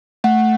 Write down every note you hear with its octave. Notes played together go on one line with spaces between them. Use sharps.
A3 F#5